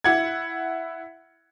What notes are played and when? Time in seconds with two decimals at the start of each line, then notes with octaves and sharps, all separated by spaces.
0.04 E4 F#5 G#6